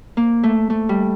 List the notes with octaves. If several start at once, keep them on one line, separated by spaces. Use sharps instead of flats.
A#3
A3
A3
G3